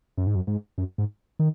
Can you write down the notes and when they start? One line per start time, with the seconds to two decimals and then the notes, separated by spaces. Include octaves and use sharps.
0.17 F#2
0.27 G#2
0.35 F#2
0.47 G#2
0.78 F#2
0.98 G#2
1.39 D#3